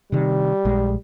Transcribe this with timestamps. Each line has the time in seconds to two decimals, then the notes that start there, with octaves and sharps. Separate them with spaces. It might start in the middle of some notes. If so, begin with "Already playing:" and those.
0.12 C3 D#3 G3
0.65 A#1 G#3